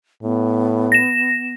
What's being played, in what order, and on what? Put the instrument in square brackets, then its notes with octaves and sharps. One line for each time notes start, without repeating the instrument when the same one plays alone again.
[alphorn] A2 [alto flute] B3
[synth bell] A#6 E7